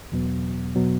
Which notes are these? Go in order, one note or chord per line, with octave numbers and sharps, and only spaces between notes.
E2 B2 F#3 B3
B2 F#3 B3